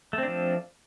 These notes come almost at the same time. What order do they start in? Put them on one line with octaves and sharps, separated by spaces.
A3 C4 D4 F3